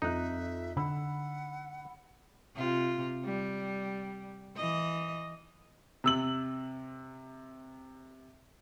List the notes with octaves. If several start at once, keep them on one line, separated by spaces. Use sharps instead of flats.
F2 D#4 E5 F#6
D3 F#5 B5 E6
C3 F4
G3
E3 D#5
C3 E6 F#7